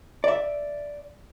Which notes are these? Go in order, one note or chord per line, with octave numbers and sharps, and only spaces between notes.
D5 E5